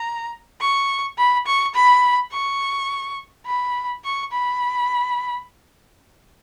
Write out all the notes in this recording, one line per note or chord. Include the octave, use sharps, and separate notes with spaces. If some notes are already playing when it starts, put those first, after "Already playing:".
Already playing: A#5
C#6
B5
C#6
B5
C#6
B5
C#6
B5